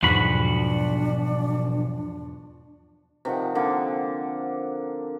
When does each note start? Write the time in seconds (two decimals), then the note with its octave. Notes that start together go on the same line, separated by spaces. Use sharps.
0.03 B1 E2 G#2 F3 D4 F#4 B5
3.25 C3 D#3 F3 F#5
3.55 D3 A#3 C4